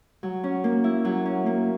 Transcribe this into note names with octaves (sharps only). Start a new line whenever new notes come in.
F#3
C#4
A#3
E4
F#3
C#4
A#3